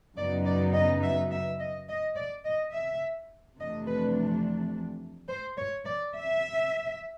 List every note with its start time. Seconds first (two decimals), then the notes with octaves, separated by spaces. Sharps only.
0.17 F#2 C#3 F#3 B3 D#4 D5
0.45 D5
0.74 D#5
1.03 E5
1.31 E5
1.59 D#5
1.88 D#5
2.16 D5
2.45 D#5
2.72 E5
3.58 F2 C3 E3 A3 D4 D#5
3.87 B4
5.28 C5
5.56 C#5
5.86 D5
6.14 E5